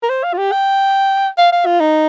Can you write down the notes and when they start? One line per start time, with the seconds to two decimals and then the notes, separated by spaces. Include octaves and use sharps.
0.03 A#4
0.09 C5
0.24 F5
0.33 F4
0.38 G4
0.52 G5
1.38 F5
1.52 F5
1.66 F4
1.80 D#4